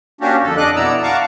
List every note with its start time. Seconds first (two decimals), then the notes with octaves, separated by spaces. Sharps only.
0.21 A#3 C#4 D4 F#4 G4
0.43 F2 D3 A4
0.57 D4 D#5 D6 F#6
0.76 B2 B3 E4 D5 A#5 E6
1.03 F5 F#5 A5 A#5 C#6 D6